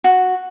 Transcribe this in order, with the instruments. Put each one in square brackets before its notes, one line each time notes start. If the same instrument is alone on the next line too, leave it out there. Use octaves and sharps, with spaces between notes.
[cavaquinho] F#4